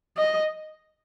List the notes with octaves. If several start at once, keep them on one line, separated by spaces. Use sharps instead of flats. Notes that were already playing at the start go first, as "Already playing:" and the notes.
D#5